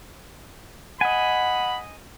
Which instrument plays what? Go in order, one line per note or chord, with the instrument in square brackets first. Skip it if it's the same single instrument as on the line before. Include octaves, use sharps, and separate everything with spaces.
[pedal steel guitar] D#5 G#5 [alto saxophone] F#5 [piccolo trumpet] B5